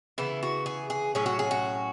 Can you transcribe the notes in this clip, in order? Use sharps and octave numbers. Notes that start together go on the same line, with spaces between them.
C#3 E3 B3 E4
F#4
G#4
G#4
A2 F#3 C#4 G#4
F#4
G#4
F#4